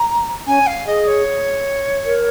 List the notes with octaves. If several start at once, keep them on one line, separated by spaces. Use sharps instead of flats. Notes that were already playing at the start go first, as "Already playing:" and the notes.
Already playing: A#5
C#4 G#5
F5
G#4 D#5
C#5
A#4